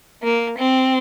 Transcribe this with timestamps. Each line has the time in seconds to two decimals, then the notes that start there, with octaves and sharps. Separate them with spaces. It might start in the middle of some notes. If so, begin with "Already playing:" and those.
0.23 A#3
0.58 C4